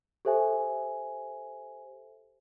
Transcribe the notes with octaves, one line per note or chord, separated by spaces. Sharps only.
G4 A4 C5 E5 G#5